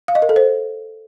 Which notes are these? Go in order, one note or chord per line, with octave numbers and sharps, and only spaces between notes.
F5
D#5
A#4
A4
C5